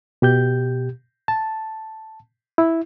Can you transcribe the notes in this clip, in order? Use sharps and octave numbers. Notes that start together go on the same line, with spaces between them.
B2 G4 G6
A5
E4